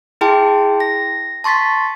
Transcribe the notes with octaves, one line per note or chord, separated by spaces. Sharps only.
E4 G#4 G5 A5 C6
A#6
A5 C6 C#6 A6 B6